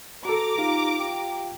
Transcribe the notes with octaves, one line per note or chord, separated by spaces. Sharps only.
F#4 A4 A#5 D6
D#4 F4 G4 F5
G5